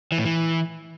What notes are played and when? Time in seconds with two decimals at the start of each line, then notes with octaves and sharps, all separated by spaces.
0.12 E3
0.18 A2
0.25 E3